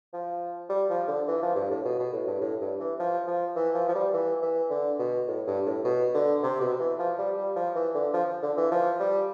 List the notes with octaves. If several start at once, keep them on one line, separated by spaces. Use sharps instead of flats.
F3
G3
F3
D3
E3
F3
G2
A2
B2
B2
A2
G2
A2
G2
E3
F3
F3
E3
F3
F3
G3
E3
E3
D3
B2
A2
G2
A2
B2
D3
C3
B2
E3
F3
G3
G3
F3
E3
D3
F3
D3
E3
F3
G3